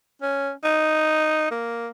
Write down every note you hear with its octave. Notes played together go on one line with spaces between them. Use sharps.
C#4
D#4
A#3